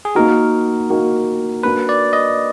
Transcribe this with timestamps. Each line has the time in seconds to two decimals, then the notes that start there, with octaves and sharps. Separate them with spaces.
0.05 G#4
0.15 A#3 D#4 F#4 A#4
0.90 A#3 D#4 F#4
1.63 A#3 D4 F#4 B4
1.89 D5
2.13 D#5